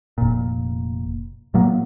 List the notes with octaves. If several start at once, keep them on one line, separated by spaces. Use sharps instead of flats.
F1 A#2
A2 F#3 A#3 B3